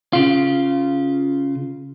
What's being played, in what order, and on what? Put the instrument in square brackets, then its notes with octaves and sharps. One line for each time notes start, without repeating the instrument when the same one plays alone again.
[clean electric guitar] C#3 F4